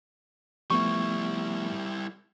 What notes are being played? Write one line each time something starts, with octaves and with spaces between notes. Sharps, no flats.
F3 G3 A3 B3 E4 C#6